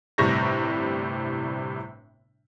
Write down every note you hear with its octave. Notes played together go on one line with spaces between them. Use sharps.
G1 A2 C3 G3 C#6 A#6